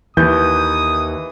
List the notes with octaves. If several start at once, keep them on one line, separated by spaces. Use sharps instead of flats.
D#2 E3 D#6 G6